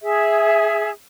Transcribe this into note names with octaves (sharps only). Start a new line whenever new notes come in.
G#4 E5